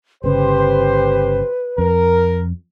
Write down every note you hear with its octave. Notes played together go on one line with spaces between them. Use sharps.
G1 C#3 G4 B4 C5
F2 A#4